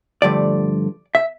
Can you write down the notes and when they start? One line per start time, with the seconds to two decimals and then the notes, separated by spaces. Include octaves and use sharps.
0.22 G2 D3 F3 A3 D5
1.15 E5